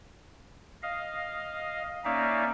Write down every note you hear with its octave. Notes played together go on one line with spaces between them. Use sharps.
D#5 F5
A#3 C#4 D#4 D5 E5 F5